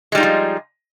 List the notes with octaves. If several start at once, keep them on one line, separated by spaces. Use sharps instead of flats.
F3 G3 G#3 D#4 F4